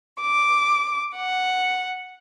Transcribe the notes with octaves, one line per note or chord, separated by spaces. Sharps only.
D6
F#5